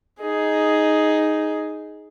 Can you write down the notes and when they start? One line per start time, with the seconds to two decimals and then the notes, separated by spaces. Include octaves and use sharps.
0.20 D#4 G#4